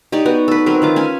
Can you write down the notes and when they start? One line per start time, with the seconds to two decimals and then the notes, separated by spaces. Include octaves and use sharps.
0.12 D#4 G4 C#5 D5
0.25 B3 F#4
0.48 A4 B4
0.66 F#3 C4 A#4 B4
0.82 D#3 F4 D6
0.96 C#4 G#5 B5